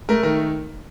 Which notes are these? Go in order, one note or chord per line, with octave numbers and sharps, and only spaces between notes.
A3 A#4
D#3 A#4